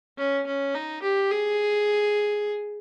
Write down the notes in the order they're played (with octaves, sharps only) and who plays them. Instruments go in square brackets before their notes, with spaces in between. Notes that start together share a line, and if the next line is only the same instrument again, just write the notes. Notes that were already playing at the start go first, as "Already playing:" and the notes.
[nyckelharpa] C#4
C#4
D#4
G4
G#4